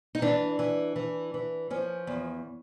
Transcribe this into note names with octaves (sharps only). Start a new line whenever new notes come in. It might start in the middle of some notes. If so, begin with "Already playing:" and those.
D#4
E3 D4
E3
E3
E3
F3 C#4
E2